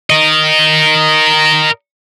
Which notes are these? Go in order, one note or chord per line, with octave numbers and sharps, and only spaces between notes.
A#4 D#5